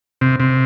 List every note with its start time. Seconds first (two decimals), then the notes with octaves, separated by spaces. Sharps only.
0.21 C3
0.40 C3